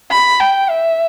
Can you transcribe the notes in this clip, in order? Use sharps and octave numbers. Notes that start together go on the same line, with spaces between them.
B5
G5
E5